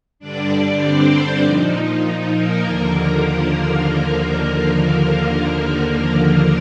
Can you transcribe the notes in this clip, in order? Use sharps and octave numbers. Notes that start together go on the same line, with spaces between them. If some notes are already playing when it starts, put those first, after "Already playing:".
G2 D3 G3 D4 D5
D4 D5
C4 C5
A#2 F3 D#4
D#4
A#3 A#4
D#2 D3 F3
A#3 A#4